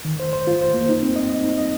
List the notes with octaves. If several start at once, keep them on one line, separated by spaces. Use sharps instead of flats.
D#3
C5
C5
F4
C5
A#3
D#4
C4
D#5
D#5
D#4
D#5